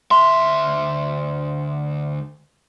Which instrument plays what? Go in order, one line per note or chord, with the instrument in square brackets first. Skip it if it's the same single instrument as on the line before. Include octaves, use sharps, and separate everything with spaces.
[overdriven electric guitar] D2 E5 [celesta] C6